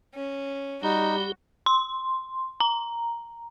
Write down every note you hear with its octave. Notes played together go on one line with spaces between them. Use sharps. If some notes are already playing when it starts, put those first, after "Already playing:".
C#4
G3 D#4 F#4 G4
C6
A#5